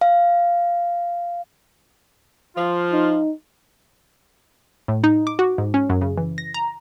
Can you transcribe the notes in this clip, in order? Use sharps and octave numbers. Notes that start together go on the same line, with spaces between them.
F5
F3 F4
D#4
A2
D#4
D6
F#4
G#2
C#4
F#2
C#3
E3
A#6
A#5